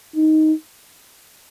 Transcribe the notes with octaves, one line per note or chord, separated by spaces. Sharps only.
D#4